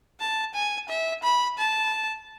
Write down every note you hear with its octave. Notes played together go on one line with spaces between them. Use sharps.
A5
G#5
E5
B5
A5